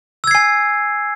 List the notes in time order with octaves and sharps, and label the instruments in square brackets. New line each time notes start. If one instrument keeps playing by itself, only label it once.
[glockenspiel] E6
G#6
C7
G#5